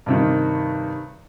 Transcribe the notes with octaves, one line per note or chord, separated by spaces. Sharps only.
G2 C3 D#3